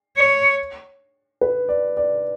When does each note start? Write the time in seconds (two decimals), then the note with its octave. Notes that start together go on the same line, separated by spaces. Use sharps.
0.17 C#5
1.41 B4
1.69 D5
1.97 D5